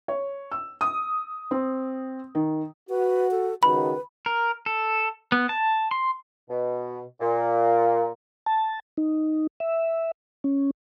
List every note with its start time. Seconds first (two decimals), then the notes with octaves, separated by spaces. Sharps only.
0.08 C#5
0.52 E6
0.81 D#6
1.51 C4
2.35 D#3
2.90 F#4 B4
3.31 A4
3.63 C#2 D#3 F#4 B4 B5
4.26 A#4
4.66 A4
5.32 B3
5.49 A5
5.91 C6
6.49 B2
7.21 A#2
8.46 A5
8.97 D#4
9.60 E5
10.44 C#4